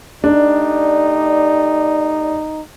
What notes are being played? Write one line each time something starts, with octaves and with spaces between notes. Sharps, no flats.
A3 D4 D#4 G4 D5